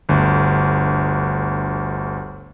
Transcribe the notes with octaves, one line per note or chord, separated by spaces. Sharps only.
G1 D2